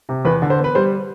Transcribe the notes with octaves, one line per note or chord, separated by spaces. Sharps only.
C3
E2 B4
D3
C5
B3
B4
G3 C5